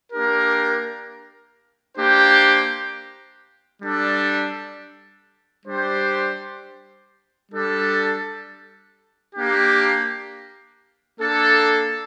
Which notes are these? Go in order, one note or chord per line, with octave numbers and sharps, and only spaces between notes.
A#3 D4 G4 A#4
A#3 D4 G4 C5 G5
G3 D4 A4
G3 D4 G4 C5
G3 D4 A4
A#3 D4 G4
A#3 D4 A4